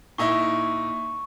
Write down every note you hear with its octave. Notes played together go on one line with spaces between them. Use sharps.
A#2 D#4 E4 C#6